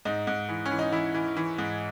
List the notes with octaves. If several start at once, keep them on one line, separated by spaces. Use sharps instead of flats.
G#2 D#4
G#2
E3
C#4
E3
D#4
E3 E4
E3
E3
G#2